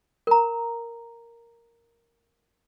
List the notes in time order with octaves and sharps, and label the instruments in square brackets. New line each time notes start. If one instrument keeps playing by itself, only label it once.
[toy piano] A#4 A#5